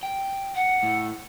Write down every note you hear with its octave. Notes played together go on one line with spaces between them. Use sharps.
G5
F#5
A2